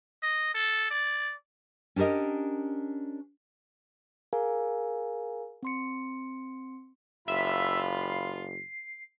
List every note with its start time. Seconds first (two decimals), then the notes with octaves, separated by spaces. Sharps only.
0.23 D#5
0.54 A4
0.91 D5
1.96 C#4 D4 G4 A#4 D#5
4.33 G#4 A#4 F5 G#5 A#5
5.63 C4 C6 C#7
7.28 F#1 F4 E5 B5
8.02 C7